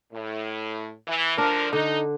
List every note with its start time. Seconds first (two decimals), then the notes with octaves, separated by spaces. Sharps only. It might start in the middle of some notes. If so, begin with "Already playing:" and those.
0.13 A2
1.08 E3
1.38 D3 F3 D4 A#4
1.73 D3 D#4